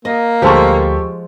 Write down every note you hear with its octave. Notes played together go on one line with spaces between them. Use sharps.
A#3 D#5
D2 F3 G#3 F4 G4 A4 C#6